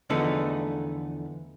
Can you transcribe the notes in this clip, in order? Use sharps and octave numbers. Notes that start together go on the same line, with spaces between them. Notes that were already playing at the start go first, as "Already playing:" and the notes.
E2 D3 F3 A3 B3 D#4